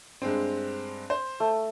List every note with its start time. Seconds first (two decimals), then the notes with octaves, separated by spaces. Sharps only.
0.22 G2 G#3 C4
1.10 C5
1.40 A3